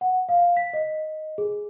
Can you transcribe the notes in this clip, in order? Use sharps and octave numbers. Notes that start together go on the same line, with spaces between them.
F#5
F5
B6
D#5
G#4